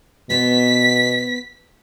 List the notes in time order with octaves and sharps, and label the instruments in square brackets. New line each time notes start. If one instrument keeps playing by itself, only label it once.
[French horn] B2 [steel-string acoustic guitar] B3 C5 [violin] B6